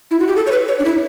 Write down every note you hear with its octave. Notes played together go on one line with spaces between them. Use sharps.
E4
F#4
G4
A4
C#5
B4
C#5
D4
E4